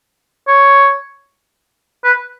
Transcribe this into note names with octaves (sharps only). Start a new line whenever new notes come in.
C#5
B4